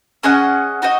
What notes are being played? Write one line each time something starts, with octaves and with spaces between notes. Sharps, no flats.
C#4 G#4 D#5 F#5
D#4 F#4 D#5